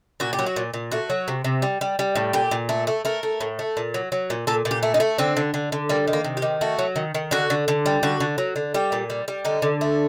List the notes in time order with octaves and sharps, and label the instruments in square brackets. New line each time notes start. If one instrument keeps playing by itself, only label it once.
[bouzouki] A#2 F#4
G4
F#3
F#4
A#2
A#2
A3 F#4
F#3
C3
C3
G3
G3
G3
A2
A#2 G4
A#2
A3
A3
A3 A#4
A3
A2
A3
A#2
F#3
F#3
A#2
A#2 A4
A#2
G4
A3
D#4
A3
D3 C4
D3
D3
D3
G3 A#3
D#3
A#3
C3
G4
D#3
A3 F#4
F#3
D#3
D#3
D3 F#4
D3
D3
G3
D3 F#4
D3
F#3
D3
G3 G4
A#2
G3
G3
D3 D#4
D3
A3